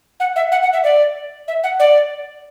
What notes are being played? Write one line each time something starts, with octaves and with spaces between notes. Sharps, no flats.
F#5
E5
F#5
F#5
E5
D5
E5
F#5
D5